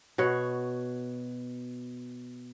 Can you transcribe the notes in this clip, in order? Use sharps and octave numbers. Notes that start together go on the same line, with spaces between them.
B2 F#4 C#5 F#5